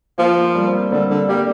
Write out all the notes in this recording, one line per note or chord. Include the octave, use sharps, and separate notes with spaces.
F3 A#3
A#3
G3
C4
A#3
D3 G3 C4
D3
G3 A#3